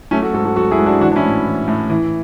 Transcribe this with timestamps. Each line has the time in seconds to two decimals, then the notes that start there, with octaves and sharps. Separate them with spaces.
0.11 F#3 A3 C#4
0.22 F#4 A4
0.33 G#2 F#4 A4
0.45 F#4 A4
0.56 F#3 F#4 A4
0.71 E4 G#4
0.78 G#2
0.86 D4 F#4
1.01 E3 D4 F#4
1.12 D4
1.16 C#4 E4
1.23 A2
1.45 E3
1.68 A2
1.90 E3